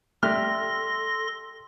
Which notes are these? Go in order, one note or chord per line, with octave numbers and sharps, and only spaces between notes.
G3 A3 A4 C6 F6 A#6